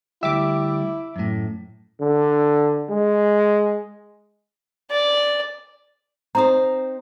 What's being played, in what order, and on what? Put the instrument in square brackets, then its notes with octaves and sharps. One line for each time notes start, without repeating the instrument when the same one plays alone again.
[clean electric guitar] D2 G3 G4 [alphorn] E4 [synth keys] E5 D6
[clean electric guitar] F#2 A2
[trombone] D3
G#3
[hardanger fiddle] D5
[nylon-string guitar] C4 D#4 C5 [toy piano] A#5 D#6